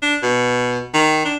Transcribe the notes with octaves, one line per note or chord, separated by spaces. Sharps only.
D4
B2
D#3
D4